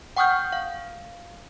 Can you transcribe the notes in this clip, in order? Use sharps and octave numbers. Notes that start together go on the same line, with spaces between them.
F#5 G5 C#6 D#6 F6 G6
F5